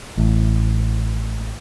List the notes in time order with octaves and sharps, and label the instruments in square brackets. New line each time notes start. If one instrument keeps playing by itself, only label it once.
[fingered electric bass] A1 A2